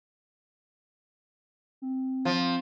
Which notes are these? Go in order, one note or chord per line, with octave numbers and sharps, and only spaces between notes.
C4
F3